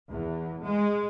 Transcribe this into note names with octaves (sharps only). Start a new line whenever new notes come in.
E2
G#3